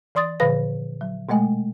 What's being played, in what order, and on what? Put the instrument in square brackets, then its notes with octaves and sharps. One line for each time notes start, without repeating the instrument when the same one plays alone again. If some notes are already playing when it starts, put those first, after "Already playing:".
[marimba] E3 D5 C6 D#6 A6
A#2 D3 F3 B4 F5 A#6
F#3
B2 G#3 A3 D#5 G#5